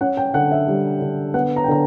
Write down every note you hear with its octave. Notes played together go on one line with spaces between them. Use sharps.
C#4 F#5
G5
D3 F#5
E5
G3
D3
B3 F#5
A#5
G5
D3 A#5